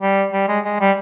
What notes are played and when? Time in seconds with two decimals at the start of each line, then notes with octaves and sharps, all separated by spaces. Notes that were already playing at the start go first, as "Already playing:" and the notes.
0.02 G3
0.33 G3
0.48 G#3
0.65 G#3
0.80 G3